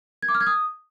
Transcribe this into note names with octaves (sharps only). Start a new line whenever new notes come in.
G#6
D6
F6
G#6
D#6